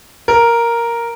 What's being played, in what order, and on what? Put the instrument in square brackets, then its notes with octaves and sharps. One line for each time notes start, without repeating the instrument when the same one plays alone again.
[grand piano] A#4